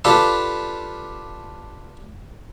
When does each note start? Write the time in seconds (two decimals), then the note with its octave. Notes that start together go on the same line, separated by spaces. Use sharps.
0.05 D4 F4 G4 A4 B4